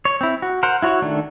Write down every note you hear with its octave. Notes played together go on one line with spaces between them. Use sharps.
C#5
C4 E4
F#4
A#4 C5 F#5
E4 F#4 C#5
D#3 A3 D4